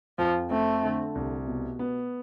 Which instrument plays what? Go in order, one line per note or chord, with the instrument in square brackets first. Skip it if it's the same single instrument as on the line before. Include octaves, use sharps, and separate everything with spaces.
[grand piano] F2 [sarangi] F3
[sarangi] A3 [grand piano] C4
[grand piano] D3
C2
B2
B3